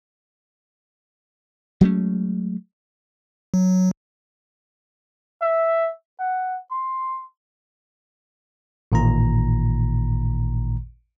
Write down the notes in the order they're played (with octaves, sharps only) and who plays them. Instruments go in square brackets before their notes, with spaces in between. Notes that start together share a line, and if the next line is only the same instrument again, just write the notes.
[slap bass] F#3 G#3 A3 C#4
[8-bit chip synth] F#3
[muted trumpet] E5
F#5
C6
[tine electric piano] A1 A#2 D#3 A#5